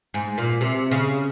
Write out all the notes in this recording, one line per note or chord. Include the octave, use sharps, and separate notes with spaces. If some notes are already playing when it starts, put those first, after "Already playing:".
G#2
A#2
C3
C#3